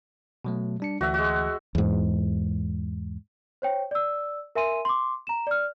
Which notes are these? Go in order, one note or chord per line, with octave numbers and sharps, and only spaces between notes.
B2 F#3 A3
G3 D4 C#7
D2 E3 F#4 E5
G#3 F#4
E2 G#2
C5 C#5 G5
D5 E6
A#4 E5 G#5 C6 D#7
C6 D6
A#5 E7
D5 F6